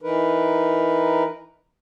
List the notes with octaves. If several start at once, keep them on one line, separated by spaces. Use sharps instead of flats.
E3 D#4 A#4 B4